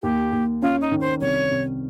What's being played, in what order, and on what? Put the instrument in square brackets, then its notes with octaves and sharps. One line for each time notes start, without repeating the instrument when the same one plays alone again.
[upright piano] D#2 [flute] G4
[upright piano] D#2
[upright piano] C#4 [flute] F4
[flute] D#4
[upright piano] D#3
[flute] C5
[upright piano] C2 [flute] C#5
[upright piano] C3